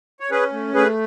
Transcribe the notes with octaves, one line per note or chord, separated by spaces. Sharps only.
C#5
C#4 G#4 B4
A3
A3 G#4 B4